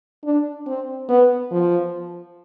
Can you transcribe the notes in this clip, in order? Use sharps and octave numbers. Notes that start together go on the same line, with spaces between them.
D4
C4
B3
F3